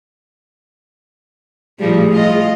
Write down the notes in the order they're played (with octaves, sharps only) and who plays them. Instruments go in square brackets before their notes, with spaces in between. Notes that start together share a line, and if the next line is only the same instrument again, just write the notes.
[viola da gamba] A2 F3 G3 [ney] G#4
[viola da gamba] F4 D#5